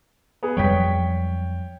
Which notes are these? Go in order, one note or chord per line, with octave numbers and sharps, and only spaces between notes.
B3 G#4
F2 F#3 G3 C#5 G5 B6